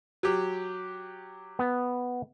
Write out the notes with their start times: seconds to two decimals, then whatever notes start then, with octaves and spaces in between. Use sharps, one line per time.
0.23 F#3 G4
1.59 B3